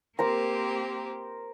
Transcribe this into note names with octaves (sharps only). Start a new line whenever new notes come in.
A#3 C4 G4 A#4 C5 A#5